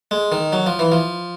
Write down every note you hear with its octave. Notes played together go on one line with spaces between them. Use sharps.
G#3
D#3
F#3
F3
E3
F3